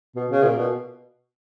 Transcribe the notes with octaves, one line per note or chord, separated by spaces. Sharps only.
B2
C#3
A#2
B2